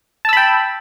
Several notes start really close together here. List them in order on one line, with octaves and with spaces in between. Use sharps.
A5 E6 B5 G5